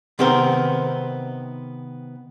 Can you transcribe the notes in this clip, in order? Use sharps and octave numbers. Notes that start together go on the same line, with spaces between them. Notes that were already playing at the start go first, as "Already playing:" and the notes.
C3 D#3 B3 C4 A#4 C5